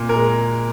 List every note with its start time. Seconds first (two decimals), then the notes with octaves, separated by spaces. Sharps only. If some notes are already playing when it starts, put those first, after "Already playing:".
Already playing: A#2
0.09 A#4
0.16 G#3